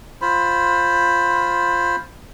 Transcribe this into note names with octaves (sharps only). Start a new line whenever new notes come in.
F4 C5 B5